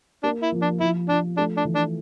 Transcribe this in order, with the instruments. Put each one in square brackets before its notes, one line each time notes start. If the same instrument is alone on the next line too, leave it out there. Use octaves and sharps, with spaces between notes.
[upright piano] A#3 [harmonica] D4
[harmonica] E4
[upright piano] F3
[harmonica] D4
[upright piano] F3 [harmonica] E4
[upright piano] F3 [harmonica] D4
[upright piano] A3 [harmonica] D4
[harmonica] D4
[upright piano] E3
[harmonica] D4